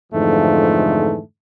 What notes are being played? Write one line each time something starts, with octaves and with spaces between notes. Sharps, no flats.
F2 G#2 D3 E3 F3 A3